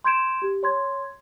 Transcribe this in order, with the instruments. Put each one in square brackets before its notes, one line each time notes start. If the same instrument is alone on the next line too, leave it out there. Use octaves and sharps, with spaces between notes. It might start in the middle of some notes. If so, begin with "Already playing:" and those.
[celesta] C6 G6 G#6 D7 E7
G4
C#5 C6 G#6